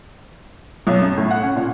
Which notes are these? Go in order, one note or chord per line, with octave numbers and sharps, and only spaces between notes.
B1
F#2
A2
F#5
C#4
A#2